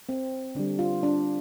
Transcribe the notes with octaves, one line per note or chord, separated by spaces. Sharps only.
C4
D3 G3 D4
F4
D4